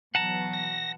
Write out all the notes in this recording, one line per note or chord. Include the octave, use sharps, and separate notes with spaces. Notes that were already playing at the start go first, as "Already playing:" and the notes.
B2 E3 F#3 F#5 A5 A#5
A#6